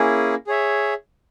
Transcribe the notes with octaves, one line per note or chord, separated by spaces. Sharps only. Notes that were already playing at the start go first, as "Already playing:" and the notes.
Already playing: A#3 C#4 E4 G#4
G#4 C#5 E5